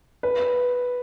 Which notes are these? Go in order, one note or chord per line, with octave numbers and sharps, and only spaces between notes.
B4